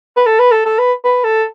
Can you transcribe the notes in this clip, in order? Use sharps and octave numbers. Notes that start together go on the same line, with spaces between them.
B4
A4
B4
A4
A4
B4
B4
A4